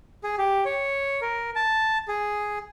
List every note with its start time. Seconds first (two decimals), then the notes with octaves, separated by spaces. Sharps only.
0.24 G#4
0.38 G4
0.65 C#5
1.21 A#4
1.55 A5
2.08 G#4